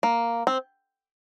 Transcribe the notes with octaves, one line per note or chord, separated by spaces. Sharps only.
A#3
C4